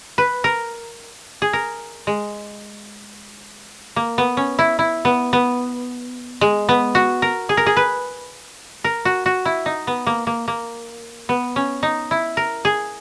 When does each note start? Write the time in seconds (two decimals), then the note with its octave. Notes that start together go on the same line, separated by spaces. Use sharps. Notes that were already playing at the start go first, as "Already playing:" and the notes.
0.18 B4
0.44 A#4
1.42 G#4
1.53 A#4
2.07 G#3
3.96 A#3
4.18 B3
4.37 C#4
4.59 E4
4.79 E4
5.05 B3
5.33 B3
6.41 G#3
6.69 B3
6.95 F#4
7.22 A#4
7.49 G#4
7.57 A#4
7.66 G#4
7.77 B4
8.84 A#4
9.05 F#4
9.26 F#4
9.45 E4
9.66 D#4
9.87 B3
10.07 A#3
10.27 A#3
10.48 A#3
11.29 B3
11.56 C#4
11.83 D#4
12.11 E4
12.37 A#4
12.65 G#4